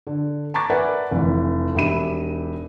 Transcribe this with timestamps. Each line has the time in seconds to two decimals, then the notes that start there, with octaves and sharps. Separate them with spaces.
0.07 D3
0.54 A5 A#5 C#6 D6 A6
0.70 A#4 B4 D5 E5 F#5 G#5
1.11 F1 E3
1.75 E1 D#4 G4 E5 B5 D#7